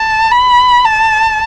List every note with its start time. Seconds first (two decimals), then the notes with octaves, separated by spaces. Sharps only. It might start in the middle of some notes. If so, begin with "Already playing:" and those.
Already playing: A5
0.32 B5
0.85 A5